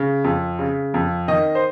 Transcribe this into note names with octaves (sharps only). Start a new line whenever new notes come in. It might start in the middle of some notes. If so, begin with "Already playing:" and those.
Already playing: C#3
F2
C#3
F2
D#3 D#5
C5